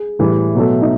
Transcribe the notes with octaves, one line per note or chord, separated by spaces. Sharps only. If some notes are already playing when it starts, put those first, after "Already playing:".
Already playing: G#4
A2 E3 G3
B2 F#3 A3
D#4